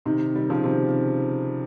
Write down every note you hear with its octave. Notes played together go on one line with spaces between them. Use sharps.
C3 D#3
D#3 G3
C#3 F3
C3 D#3